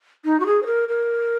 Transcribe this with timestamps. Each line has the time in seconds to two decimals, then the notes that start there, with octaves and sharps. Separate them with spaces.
0.25 D#4
0.40 F#4
0.46 G#4
0.63 C5
0.66 A#4
0.89 A#4